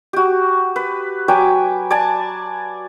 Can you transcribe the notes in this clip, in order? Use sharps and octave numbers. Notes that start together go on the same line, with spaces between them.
F#4 G4
B4
F#3 G5 G#5 D6
D5 G#5 A5